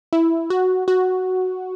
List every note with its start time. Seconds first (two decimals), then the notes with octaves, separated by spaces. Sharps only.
0.13 E4
0.50 F#4
0.88 F#4